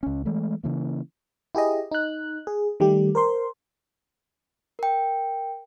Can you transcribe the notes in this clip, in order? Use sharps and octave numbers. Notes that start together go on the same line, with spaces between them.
C#2 C#4
E3 G#3 A3
C#3 E3 A#3
E4 G4 G#4 D#5
D#4 F#6
G#4
D#3 G3 A3 G4
A#4 C5 C6
A#4 G5